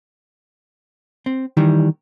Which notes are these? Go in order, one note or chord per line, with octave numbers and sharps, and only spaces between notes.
C4
D#3 E3 G3